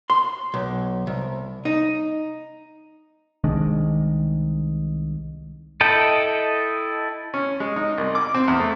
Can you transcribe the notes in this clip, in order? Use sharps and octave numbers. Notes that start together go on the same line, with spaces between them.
C6
B1
C2
D#4
C2 D#3 G#3 D4
E4 A4 D#5 G5
C#4
G#3
D#4
C2
D6
C4
E2
A3